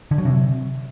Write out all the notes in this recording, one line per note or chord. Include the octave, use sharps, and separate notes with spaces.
D3
F#3
C3